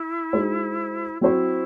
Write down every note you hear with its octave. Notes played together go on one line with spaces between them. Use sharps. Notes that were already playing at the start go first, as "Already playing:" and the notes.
Already playing: E4
G#3 D#4 F#4 C5
F#3 C4 E4 F#4 C5